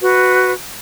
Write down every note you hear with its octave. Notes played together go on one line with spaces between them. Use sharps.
F#4 B4